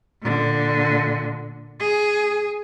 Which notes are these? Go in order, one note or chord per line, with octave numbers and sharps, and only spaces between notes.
A#2 D3
G#4